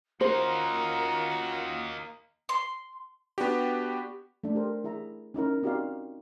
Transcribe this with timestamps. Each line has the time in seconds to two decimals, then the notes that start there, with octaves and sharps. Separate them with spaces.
0.21 A#3 C#4 D#4 F4 F#4 A#4 C5
2.49 C6
3.38 B3 D4 F#4 G4
4.44 A3 D4
4.55 G4 A#4 C5
4.84 E4 G#4 E5 A#5
5.34 C#4 D#4 E4 A#4
5.63 C4 D#4 F#4 G4 D5 F5